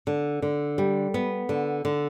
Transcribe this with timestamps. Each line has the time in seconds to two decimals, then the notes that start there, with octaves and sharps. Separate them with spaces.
0.07 D3
0.42 D3
0.78 G3
1.14 B3
1.49 D3
1.85 D3